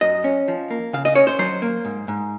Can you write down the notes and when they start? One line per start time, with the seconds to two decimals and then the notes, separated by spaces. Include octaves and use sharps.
0.01 F#2 D#5
0.24 C#4
0.48 F3
0.71 A#3
0.93 C#3 F5
1.05 D#5
1.15 C#4 C#5
1.27 C5
1.39 F#3 C5
1.62 A#3
1.85 G#2
2.08 G#2